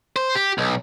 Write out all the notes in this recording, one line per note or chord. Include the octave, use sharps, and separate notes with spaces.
C5
G4
B1